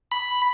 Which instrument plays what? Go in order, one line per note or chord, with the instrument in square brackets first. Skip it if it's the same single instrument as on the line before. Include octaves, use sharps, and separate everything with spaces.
[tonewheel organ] B5